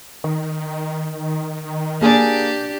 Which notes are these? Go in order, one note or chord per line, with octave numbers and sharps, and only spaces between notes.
D#3
A#3 D4 G4 G#4 G#5